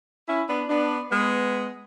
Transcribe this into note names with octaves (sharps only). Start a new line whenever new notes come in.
C#4 E4
B3 D4
B3 D4
G#3 B3